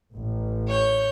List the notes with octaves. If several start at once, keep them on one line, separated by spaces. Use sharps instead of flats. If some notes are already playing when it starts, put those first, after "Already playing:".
A1
C#5 G6